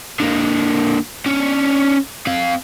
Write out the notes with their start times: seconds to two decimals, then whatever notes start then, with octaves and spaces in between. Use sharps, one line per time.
0.20 D3 A#3
1.26 C#4 D4
2.27 C4 F5